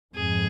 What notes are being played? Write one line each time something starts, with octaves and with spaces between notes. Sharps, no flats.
F2 G#2 G#4